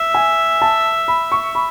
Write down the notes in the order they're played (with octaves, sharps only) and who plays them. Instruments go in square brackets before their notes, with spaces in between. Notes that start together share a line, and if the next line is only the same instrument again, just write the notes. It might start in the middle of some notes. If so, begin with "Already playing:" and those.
Already playing: [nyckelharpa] E5
[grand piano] G#5
A5
B5
C#6
B5